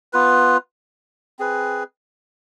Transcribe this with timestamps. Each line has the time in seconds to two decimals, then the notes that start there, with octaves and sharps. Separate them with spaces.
0.13 B3 F4 B4
1.39 C4 G#4 B4